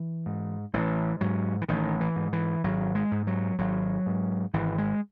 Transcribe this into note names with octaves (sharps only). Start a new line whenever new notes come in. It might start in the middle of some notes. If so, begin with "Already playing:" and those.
Already playing: E3
G#2
A1 E3
G#2 F#3
E3
A1 D#3
E3
G#2
E3
G#1 F#3
G#3
G#2
F#3
G#1 F#3
G#2
G#1 E3
G#3